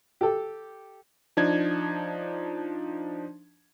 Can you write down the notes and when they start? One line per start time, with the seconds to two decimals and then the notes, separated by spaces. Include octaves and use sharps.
0.21 G4 A4
1.37 F3 D4 D#4 G#6